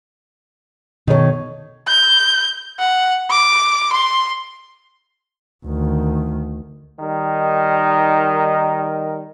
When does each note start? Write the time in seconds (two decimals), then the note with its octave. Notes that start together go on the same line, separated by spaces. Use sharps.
1.08 B2 D#3 D#4 A4 C#5
1.88 G6
2.79 F#5
3.31 D6
3.93 C6
5.66 D2 D#3
7.00 D#3 G3 D#4 A#4